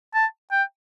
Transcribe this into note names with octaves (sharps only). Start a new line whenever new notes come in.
A5
G5